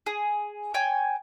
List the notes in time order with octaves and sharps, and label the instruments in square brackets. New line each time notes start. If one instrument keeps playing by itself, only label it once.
[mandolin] G#4
C#5 G5 G#5